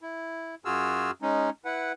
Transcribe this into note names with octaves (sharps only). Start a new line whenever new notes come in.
E4
F#2 F4 F#4 G#4 E6 F6
G#3 C#4 D#4
E4 B4 F#5